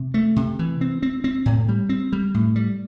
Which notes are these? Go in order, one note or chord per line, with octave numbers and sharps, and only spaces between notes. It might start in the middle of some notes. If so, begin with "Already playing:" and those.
Already playing: C3
A3
C3
E3
C4
C4
C4
A2
G3
C4
G3
A2
G3